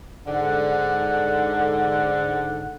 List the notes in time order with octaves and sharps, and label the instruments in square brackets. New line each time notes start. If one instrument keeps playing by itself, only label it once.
[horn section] G#2 D3 F#5